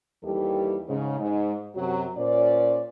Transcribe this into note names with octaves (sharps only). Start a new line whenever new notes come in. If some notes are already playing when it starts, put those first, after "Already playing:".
D#2 E3 G3 G4 A4
G#2 C#3
G#2
F#2 C3 F#3
A#2 C#4 C5 D5